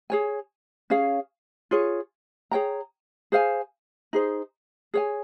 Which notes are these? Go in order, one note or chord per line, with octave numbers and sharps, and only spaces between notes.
G#4 C#5 G#5
C#4 G#4 C#5 F5
F4 G#4 C#5
G#4 C#5 G5 A#5
G#4 C5 F5 G#5
D#4 G#4 C5
G#4 C#5 G#5